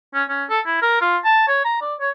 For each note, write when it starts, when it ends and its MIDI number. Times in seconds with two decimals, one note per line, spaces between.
0.14 0.23 61
0.29 0.44 61
0.50 0.60 69
0.66 0.79 64
0.82 0.97 70
1.01 1.17 65
1.25 1.43 81
1.48 1.64 73
1.65 1.76 82
1.81 1.94 74
2.00 2.10 73